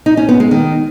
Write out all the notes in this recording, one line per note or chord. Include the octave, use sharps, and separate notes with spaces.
D#4
C#4
B3
G#3
D#3